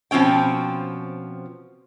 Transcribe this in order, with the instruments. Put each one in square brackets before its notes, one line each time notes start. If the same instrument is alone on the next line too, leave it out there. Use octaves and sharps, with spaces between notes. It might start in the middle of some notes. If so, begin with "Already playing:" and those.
[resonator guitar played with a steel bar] B2 F3 C4 C#4 G5